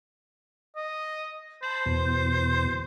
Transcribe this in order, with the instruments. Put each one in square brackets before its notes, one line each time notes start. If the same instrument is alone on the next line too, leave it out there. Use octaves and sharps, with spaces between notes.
[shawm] D#5
[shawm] C5 [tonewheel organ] A5 B5
[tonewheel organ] E2 B2